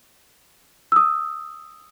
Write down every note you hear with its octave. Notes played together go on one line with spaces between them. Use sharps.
D#6 E6